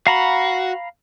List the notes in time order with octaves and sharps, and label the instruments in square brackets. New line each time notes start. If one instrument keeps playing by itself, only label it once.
[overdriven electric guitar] F#4 [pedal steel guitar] F5 A#5 B5